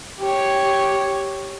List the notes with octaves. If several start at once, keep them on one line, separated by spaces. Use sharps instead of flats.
G4 C#5